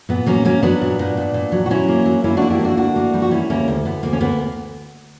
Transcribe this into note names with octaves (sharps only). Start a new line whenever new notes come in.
A#2 B3
F#3 A#3 C#4
F#3 A#3 C#4
F#3 B3 D4
A#2
A#2
A#2
A#2
F#3
F#4
F#3 C#4 E4
A#3
F#3
A#3 C#4 E4
A#3 D4 F#4
E4 G4
A#3 D4 F#4
D2 D4 F#4
A#3
G3
F#4
G3 C#4 E4
D2 A#3 C#4
D2
D2 B3
D2 A#3
C#4
A#3 B3